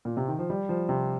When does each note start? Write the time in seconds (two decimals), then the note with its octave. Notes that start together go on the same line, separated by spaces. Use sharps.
0.05 A#2
0.17 C3
0.28 D#3
0.39 F3
0.50 G3
0.69 F3
0.89 C3